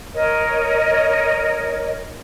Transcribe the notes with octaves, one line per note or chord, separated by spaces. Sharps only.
A#4 C#5 D#5